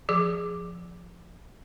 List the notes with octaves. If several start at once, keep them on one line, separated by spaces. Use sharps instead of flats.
F3 G#4 D6